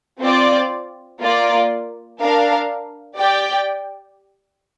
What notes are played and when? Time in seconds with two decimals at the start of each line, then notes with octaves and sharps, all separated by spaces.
0.21 C4 F4 D5
1.21 A#3 F4 D5
2.20 D4 A#4 F5
3.19 G4 D5 G5